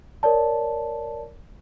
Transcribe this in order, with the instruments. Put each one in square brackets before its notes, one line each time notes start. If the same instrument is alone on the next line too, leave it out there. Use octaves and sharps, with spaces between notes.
[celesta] A#4 C#5 D5 A5